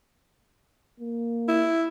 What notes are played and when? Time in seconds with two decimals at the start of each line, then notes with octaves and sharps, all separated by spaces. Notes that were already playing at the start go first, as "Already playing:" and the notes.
1.00 A#3
1.48 E4